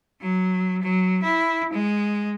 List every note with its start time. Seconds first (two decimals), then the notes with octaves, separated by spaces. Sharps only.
0.22 F#3
0.82 F#3
1.23 E4
1.73 G#3